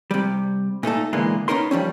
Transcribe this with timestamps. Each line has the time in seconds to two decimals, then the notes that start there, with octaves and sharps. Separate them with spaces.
0.11 C3 G3
0.83 A#2 A3 D#4 A4
1.13 A#2 D3 E3 G#3 A#3 B3
1.48 B3 C#4 D#4 A#4 C6
1.71 F3 G3 C4 C#4